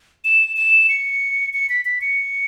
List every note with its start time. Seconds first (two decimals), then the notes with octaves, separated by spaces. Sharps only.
0.25 E7
0.57 E7
0.89 C#7
1.53 C#7
1.69 B6
1.85 B6
2.01 C#7